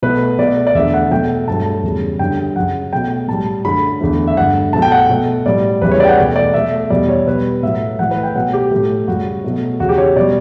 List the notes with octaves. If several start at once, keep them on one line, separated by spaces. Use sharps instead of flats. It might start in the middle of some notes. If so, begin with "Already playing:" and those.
B2 A3 B4
B2 A3 D5
D5
E2 D3 A3 E5
F#5
B2 F#3 A3 G5
G2 F#3 A3 A5
A5
E2 C#3 G3
F#2 D3 G3 G5
F#2 C#3 F#3 F#5
B2 F#3 A3 G5
A2 G3 A5
F#2 D3 F#3 A3 B5
E2 D3 A3
E5
G2 D3 A3 F#5
B2 F#3 A3 A5
G5
F#5
B2 A3
A2 G3 D5
E2 C#3 E3 G3 B4
C#5
D5
G5
F#5
E2 B2 A3
D5
B2 A3 E5
E2 B2 G3 D5
C#5
B2 G3 B4
A2 F#3 A3 E5
A2 E3 A3 F#5
B4
G5
B2 F#3 A3 F#5
G4
A2 F#3 A3
F#2 C#3 G3 F#4
B2 F#3 A3
E2 C#3 F#3 F#4
G4
C#5
B2 G3 D5